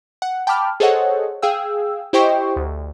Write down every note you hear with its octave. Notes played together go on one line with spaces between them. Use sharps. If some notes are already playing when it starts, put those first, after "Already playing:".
F#5
G5 A5 B5 D6 F6
G#4 A4 C5 C#5 D#5 F#5
G#4 F5 G5 E6
E4 G4 C5 D#5 G5 C#6
D2